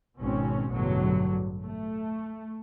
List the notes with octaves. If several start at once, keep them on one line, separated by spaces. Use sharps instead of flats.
G#1 B2 C4 C#4
A1 E2 G2 B2 D3 F#3
A3